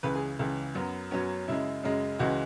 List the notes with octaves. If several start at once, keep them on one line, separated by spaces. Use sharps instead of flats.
C#2 C#3 E3 B4
G#4
C#2 C#3 E3
F#2 F#3 B3
F#2 F#3 B3 C#4
F#2 C#3 G#3 E4
F#2 C#3 G#3
C#2 C#3 E3 G#3 F#4